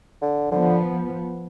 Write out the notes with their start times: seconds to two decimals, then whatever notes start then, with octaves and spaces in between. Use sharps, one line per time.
0.22 D3
0.50 D3 F3 B3